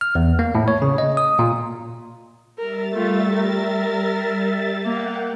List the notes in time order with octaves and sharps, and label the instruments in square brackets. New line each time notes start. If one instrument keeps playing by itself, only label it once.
[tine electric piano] F6
E2
A#3
A2
C#5
C#3
D#5
D#6
A#2
[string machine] G3 E5 A6 [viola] A#4
[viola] A3 F4
A#4
[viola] A#3 [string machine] F#5 G5